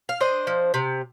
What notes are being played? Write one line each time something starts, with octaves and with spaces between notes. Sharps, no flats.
F5
D4 C5 D#5
F3
C3